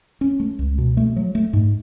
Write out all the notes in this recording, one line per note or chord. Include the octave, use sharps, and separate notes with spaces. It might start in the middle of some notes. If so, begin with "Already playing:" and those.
C#4
A3
C#2
B2
A3
F#3
A3
G#2